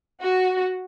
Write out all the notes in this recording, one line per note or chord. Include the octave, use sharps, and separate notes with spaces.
F#4